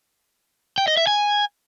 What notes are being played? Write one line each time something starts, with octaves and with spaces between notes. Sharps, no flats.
G5
D#5
E5
G#5